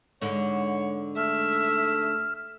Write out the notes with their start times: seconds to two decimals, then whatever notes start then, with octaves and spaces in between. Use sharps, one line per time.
0.21 G#2 D3 G#3 C#5
1.16 A3 E5 F6